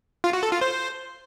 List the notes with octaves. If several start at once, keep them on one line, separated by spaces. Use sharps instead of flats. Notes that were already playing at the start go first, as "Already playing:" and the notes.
F4
F#4
A4
F4
C5